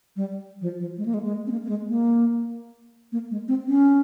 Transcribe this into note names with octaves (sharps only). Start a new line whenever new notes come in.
G3
F3
F3
G#3
A#3
G#3
G#3
C4
A#3
A#3
G#3
A#3
A#3
G#3
C4
C#4